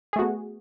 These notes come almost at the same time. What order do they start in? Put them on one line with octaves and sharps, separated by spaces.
G#4 A3 F#4 B3